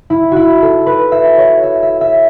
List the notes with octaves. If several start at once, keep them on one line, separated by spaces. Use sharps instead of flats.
E4
E4 F#4
A4
B4
E5
C#5
E5
E5
E5